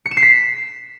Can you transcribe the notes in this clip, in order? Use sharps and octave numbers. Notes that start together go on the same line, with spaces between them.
C#7
E7
C7
B6